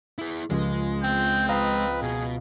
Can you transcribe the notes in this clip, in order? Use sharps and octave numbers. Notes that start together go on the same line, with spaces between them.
E4 G#4
C#2 F3 G#3
C4 G6
B4 D#5 F5 A#5
B2 G#4